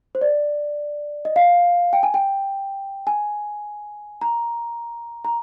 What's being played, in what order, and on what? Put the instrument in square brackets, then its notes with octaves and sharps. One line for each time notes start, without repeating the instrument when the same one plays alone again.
[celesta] C5
D5
D#5
F5
G5
G#5
G5
G#5
A#5
A#5